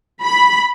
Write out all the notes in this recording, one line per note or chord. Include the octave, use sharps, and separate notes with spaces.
B5